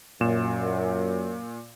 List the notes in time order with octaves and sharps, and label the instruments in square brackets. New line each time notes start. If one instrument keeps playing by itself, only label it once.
[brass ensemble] F#2 [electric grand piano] A#2 E7